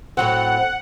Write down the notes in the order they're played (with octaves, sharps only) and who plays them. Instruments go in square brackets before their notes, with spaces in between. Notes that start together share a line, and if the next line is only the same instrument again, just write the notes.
[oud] A2 F#3 C4 [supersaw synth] F#5